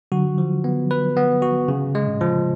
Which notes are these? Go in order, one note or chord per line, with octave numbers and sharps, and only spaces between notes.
D3 F#3 F#4
F3
B3
B4
B3
F#4
C#3
G#3
A2 C#3
F3